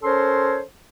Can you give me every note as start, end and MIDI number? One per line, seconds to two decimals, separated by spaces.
0.03 0.60 61
0.03 0.60 69
0.03 0.60 70
0.03 0.60 72
0.03 0.60 73
0.03 0.60 84